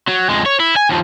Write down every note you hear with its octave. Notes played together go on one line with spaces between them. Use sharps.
F#3
F2 G#3
C#5
E4
G#5
D#2 F3